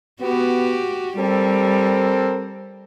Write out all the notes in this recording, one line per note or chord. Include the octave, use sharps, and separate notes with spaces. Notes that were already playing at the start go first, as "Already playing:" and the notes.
B3 F#4 G4
G3 C4 A4 A#4